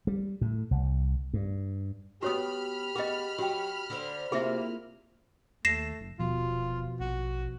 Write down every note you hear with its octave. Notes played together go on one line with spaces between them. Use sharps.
G3
A2
C2
G2
F#3 B3 F#4 G4 C#5 B5 D#6 F6
B3 F#4 G#4 D#5
F#3 F#4 G5
D3 C5
C3 A#3 E4 F4 G#4 E5
D#2 A3 A#6 C7 E7
F#1
D#1 B2 F3 F4
A#1 F#4